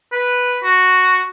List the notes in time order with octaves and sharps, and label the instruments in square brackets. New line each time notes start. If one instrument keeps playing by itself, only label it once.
[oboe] B4
F#4